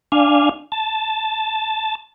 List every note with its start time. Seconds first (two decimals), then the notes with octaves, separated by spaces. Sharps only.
0.12 D4 F5 G#5
0.72 A5